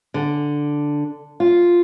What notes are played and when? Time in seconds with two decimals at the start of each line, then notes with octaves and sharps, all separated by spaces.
0.14 D3
1.40 F4